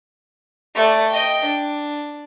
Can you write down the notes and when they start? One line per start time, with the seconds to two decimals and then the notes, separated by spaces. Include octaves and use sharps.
0.76 A3 D5
1.09 D#5 G5
1.45 D4